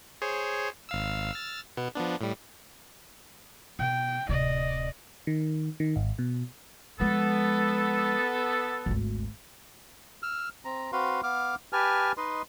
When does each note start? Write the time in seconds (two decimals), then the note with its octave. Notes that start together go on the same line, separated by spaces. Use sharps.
0.22 G#4 C5 C#5
0.89 G#1 F5 E6
1.32 E6 F6 A6
1.77 B2 B3
1.95 F3 B3 D4
2.21 A2 G3
3.79 B2 G5
4.29 D1 C3 D5 D#5
5.27 D#3
5.80 D#3
5.96 G#1
6.19 B2
7.00 F3 G#3 B3 A4
8.86 G#1 D2
10.23 E6 F6
10.65 C4 A#5
10.92 C4 F#4 B4 F5 C6
11.23 B3 F5 D6 F6
11.73 G4 B4 G#5 A5 F6
12.17 D#4 B4 D#5 C6